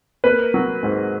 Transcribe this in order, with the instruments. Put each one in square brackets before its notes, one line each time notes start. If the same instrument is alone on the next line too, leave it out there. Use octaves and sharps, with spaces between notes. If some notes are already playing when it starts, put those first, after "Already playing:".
[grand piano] A#3 B4
F#3
G#2